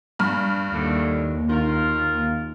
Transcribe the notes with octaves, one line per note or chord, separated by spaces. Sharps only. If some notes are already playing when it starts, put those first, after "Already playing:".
G2 B5 F6
D#2 A2 D3
D#3 F4 A#4